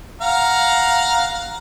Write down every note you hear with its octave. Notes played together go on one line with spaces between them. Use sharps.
F5 F#5 A#5